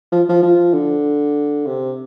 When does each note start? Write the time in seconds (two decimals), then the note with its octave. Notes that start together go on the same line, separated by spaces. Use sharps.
0.12 F3
0.29 F3
0.43 F3
0.73 D3
1.66 C3